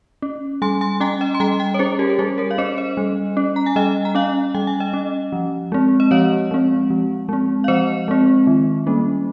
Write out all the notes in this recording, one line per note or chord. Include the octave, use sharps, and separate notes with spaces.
C#4
G3 G#5 C6
G#5 C6
C#4 G5 A#5
D#5 G5
C6
G3 G5 A#5
G5 A#5
C#5
C#4 G#4 C5
G4 A#4
C#5
G3 G#4 C5
A#4 C#5
F5
C#4 C5 D#5
C5 D#5
G3
C#4
A#5
G#5
G3 D#5 G5
A#5
C#4 F5 G#5
G3 G5
G#5
D#5 G5
C#4
F3
G#3 C4
D#5
F3 C#5 F5
G#3 C4
F3
G#3 C4
F5
F3 C5 D#5
G#3 C4
D#3
G3 A#3 C#4